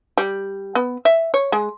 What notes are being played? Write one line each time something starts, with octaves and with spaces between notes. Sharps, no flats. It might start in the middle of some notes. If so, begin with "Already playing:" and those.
G3
B3
E5
C#5
G#3